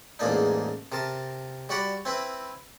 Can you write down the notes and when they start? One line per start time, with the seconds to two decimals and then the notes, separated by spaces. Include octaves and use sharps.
0.19 A1 E2 G#2 A#3 D4 D#4
0.92 C3 A#4 A5
1.69 G3 F#4 D5 F#5 B5
2.05 C4 E4 B4